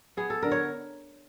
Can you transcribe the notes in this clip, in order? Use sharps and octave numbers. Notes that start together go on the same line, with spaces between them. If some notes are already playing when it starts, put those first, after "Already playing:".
B3 G#4
A4
D3 A#4
C#5